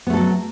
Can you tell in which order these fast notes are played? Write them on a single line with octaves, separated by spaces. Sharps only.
B3 A3 A4 F#3